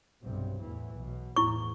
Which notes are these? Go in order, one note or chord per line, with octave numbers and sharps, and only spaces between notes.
B1 G2 C3
E2 A2 E3
B1 B2
E2 A2 E4 C#6